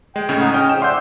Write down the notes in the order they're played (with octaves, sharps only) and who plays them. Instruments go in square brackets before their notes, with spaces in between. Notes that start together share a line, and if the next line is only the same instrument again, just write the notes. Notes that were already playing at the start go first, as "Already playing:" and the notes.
[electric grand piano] G#3 [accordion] G5
[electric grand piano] A2 C#3 C#4
[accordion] D#4 F#5 D#6
[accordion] G#3 D#5 F6 [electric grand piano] C#4 G5
[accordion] F2 G#2 G5 [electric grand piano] E7
[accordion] D5 E5 F#5 [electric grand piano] C6 G6